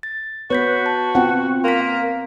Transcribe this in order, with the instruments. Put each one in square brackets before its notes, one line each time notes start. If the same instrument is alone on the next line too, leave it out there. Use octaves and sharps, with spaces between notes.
[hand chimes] A6
[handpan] B3 B4 [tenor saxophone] F#4 [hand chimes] C#5 G6 B6
[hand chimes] A5
[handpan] B3 C4 F#5 [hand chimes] F4 G5
[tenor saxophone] A#3 [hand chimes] C6 B6
[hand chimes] F5